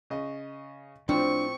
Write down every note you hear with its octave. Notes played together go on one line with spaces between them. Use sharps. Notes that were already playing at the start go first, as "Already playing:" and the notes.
C#3 D#5 C#6
A2 F3 C4 D4 C#6